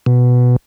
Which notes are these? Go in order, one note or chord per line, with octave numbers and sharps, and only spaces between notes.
B2